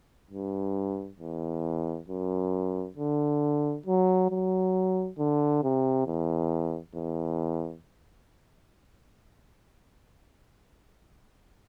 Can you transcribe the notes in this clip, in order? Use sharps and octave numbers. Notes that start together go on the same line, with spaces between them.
G2
E2
F#2
D3
F#3
F#3
D3
C3
E2
E2